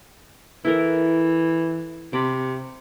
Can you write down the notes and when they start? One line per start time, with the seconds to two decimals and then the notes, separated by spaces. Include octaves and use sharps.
0.65 E3 E4 A4 A#4
2.13 C3 B5 D6